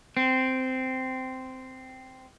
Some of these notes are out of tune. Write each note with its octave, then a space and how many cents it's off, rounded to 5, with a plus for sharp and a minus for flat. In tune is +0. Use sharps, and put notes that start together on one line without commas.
C4 -10